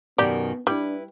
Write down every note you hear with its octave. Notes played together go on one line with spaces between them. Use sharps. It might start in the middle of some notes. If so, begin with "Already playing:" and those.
F#2 B2 D#3 B3 G4 D5
G3 D4 E4 B4